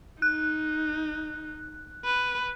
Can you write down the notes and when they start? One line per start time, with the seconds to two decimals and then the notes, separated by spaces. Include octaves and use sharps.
0.22 D#4 F#6
2.05 B4